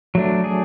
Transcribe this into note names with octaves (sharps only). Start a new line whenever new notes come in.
F#3 A3 D4
G#4